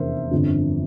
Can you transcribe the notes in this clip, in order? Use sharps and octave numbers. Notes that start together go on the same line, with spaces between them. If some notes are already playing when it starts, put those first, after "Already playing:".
Already playing: F1 E2 D3 A#4 C5 E5
G1 F2 D3 F3